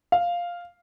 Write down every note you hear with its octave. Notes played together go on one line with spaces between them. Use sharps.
F5